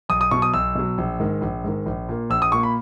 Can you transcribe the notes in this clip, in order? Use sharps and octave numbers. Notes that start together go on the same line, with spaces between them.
B1 D#6
D#6
B2 F#3 C#6
D#6
B1 E6
B2 F#3
A#1
G#2 D#3
A#1
G#2 D#3
A#1
A#2 A#3
A#1 E6
D#6
A#2 A#3 C#6
B5